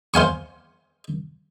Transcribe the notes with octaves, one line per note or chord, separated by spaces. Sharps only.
C5 F5 G#5 C#6